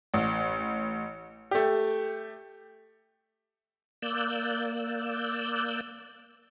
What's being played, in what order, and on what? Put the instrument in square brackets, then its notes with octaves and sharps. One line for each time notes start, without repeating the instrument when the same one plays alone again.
[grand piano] A1
A3 G4
[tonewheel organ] A#3 D5 E6 F#6 G6